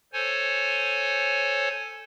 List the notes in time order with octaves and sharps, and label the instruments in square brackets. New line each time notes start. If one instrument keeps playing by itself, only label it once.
[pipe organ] A4 C5 C#5 G#5